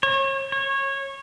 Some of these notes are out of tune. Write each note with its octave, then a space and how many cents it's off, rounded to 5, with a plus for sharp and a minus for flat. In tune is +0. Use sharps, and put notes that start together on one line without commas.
C#5 -35
C#5 -20